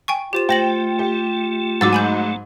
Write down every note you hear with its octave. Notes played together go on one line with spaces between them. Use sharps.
G5 G#5 C#6
F4 G4 C5 E7
A3 C5 G5 A#6 F#7
G4
G#2 F#3 F#4 D6 E6 A6
G#3 G#5 B5 G6